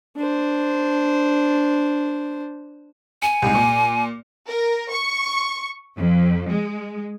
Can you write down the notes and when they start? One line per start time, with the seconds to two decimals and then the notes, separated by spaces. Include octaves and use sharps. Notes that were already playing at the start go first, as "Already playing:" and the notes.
0.17 D4 C5
3.22 G#5 C#7
3.42 C2 G#2
3.55 A#2
4.47 A#4
4.92 C#6
5.97 F2
6.50 G#3